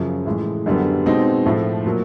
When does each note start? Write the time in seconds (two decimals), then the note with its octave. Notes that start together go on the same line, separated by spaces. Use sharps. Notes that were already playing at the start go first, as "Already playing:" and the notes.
Already playing: F#2 C#3 F3
0.26 A2 E3 G#3
0.66 F#2 D3 G3 B3
1.06 B2 G#3 C4 D#4
1.46 A2 F3 A3
1.86 A#2 F#3